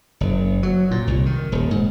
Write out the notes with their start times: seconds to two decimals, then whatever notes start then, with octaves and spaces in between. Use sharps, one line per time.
0.21 F#1
0.63 F#3
0.91 A#2
1.07 C2
1.26 D#3
1.52 D#1
1.71 G#2